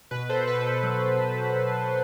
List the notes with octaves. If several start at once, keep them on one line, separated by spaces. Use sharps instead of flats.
B2 B4
A4 C5
B2 B4
A4
F#3
B2
B2